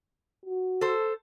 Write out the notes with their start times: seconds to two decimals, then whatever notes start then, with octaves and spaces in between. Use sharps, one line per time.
0.45 F#4
0.81 A4 C5